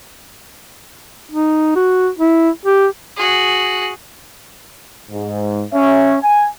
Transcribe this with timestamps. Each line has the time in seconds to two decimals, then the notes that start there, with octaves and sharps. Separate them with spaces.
1.31 D#4
1.76 F#4
2.19 E4
2.66 G4
3.16 F#4 G#4
5.11 G#2
5.73 C#4 E5
6.22 G#5